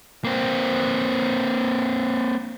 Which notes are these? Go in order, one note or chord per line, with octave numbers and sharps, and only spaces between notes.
A#3 C4